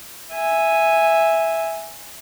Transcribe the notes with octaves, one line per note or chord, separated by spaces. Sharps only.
E5 G#5